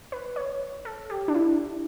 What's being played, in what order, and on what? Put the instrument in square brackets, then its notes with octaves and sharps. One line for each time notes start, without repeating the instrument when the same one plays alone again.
[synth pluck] B4
C#5
A4
G4
D4
E4